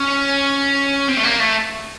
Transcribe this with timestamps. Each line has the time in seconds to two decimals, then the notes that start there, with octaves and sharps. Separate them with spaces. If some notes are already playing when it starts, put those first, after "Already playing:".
Already playing: C#4
1.08 C4
1.17 A3
1.24 A#3
1.40 A3